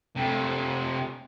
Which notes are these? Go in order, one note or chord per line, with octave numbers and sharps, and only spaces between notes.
C3 A3